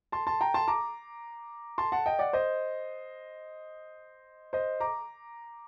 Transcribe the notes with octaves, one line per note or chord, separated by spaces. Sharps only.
A5 C6
A5 C6
G5 A#5
A5 C6
A#5 D6
A5 C6
F#5 A5
D#5 G5
D5 F#5
C5 D#5
C5 D#5
A#5 D6